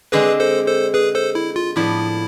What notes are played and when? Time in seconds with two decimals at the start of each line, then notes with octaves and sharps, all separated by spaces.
0.12 D3 G#3 C4 G#4 B4
0.40 A4 C5
0.67 A4 C5
0.94 G#4 B4
1.15 A4 C5
1.35 E4
1.56 F4
1.76 A2 F3 B3 D4 E4